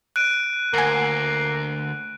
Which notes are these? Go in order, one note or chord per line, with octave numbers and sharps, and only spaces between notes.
F#6 D7 D#7
D2 A#3 F#5 G#5